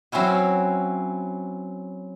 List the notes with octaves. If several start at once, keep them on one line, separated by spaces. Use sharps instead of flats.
F#3 C4 C#4 E4 F#4